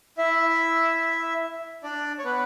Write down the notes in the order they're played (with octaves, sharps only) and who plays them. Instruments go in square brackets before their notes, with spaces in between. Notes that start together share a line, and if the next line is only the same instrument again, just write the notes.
[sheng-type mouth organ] E4 E5
D4 D5
C#5
B3 B4